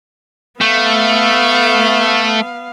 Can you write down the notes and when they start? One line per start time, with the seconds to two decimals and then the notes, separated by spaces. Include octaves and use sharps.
0.61 A3 B3 F5